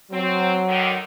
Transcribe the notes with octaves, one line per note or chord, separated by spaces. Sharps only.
F#3 C4
D3 D#3